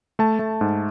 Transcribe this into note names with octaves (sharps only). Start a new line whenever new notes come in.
A3 A5
A3
G#2